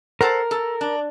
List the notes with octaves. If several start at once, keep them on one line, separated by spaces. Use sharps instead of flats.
A4 A#4 C5 F#5
A4
D4